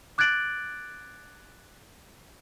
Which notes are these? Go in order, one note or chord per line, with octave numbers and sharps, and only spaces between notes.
D6 F#6 G#6 A6 D7 F#7